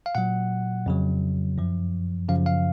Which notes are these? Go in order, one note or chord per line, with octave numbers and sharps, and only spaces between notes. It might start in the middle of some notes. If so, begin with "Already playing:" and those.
F5
A#2 F#3 F#5
F2 C#3 F#3
F#2 F3
F#2 C#3 F3 F5
F5